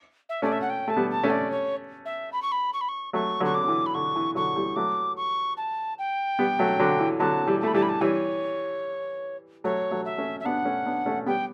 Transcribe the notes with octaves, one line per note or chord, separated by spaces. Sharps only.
E5
A3 C#4 D5
E5
F#5
G5
A3 A5
G3 B3
A5
A3 C#4
D5
C#5
E5
B5
C#6
B5
C#6
B5
C#6
F#3 A3 C#6
D3 F#3
C#6
D6
D3
E3
B5
D3 C#6
E3
D3 F#3 C#6
E3 G3
F#3 A3 D6
C#6
A5
G5
G3 B3
F#3 A3
D3 F#3
E3
D3 F#3 A5
E3 G3
A5
A3 B5
E3 G3 A5
B5
A5
E3 G3 C#5
F#3 A3 C#5
F#3 A3
E5
A3 C#4
E5
B3 D4 F#5
A3 C#4
B3 D4
A3 C#4
G3 B3 G5